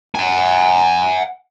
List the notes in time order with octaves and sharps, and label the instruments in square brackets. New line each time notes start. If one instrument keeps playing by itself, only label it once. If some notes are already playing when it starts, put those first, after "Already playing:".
[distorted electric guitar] F#5 G#5